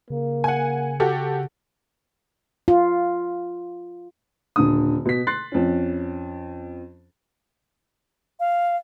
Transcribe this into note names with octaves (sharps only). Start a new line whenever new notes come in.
C#3 A#3
F#5 G#5
F#4 G4 A4
F4
D#1 D3 D#6
B2 B6
C6 F#6 A6 C7
F2 C#4
F5